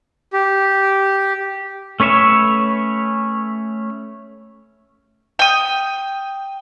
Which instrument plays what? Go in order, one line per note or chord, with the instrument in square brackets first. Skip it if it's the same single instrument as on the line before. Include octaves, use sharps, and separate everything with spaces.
[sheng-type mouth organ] G4
[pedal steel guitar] A3 C#4 B4 C#5 E5
[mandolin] G5 D#6